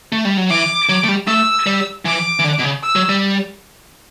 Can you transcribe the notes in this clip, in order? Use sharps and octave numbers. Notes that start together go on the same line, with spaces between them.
A3
G3
F#3
E3 D6
F#3
A3
G3
A3 E6
G3
E3 D6
E3
D3
B2
C#3
E6
F#3
G3